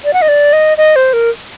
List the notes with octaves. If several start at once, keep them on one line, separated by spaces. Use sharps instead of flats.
D5
F#5
D#5
D5
D#5
D#5
C5
A#4